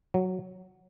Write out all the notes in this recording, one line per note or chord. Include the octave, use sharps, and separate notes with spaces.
F#3